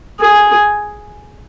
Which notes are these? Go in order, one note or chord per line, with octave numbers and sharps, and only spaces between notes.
G#4